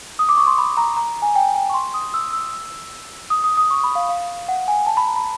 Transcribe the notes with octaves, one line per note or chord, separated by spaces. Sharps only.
D#6
D6
C#6
C6
B5
A#5
A#5
G#5
G5
G5
C#6
C6
D#6
E6
E6
D#6
D#6
D#6
C#6
B5
F5
F5
F#5
G#5
A5
B5
A#5
B5